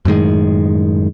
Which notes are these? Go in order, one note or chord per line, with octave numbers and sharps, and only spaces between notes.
F#2 A2 D#3 G#3